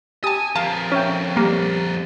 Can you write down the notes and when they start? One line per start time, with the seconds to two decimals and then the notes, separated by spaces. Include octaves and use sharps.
0.24 G4 G#5 A5 D#6
0.56 F2 A#4 F5 A5
0.92 C#4 C#5 E5 G5
1.37 G3 A#3